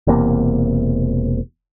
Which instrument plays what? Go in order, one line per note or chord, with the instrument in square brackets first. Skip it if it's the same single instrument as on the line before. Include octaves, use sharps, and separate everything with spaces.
[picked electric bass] E1 E2 C3 A#3